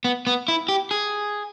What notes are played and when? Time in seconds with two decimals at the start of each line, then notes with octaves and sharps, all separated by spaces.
0.05 B3
0.27 B3
0.48 E4
0.69 G4
0.91 G#4